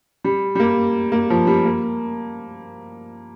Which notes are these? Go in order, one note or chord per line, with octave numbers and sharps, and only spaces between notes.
G3
G3
A#3
A#3
F3
G3
A#3